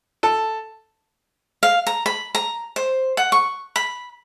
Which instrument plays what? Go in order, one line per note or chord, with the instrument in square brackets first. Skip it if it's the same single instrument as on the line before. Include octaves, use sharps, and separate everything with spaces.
[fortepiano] A4
[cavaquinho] F5
A#5
B5
A#5
C5
F#5
C#6
B5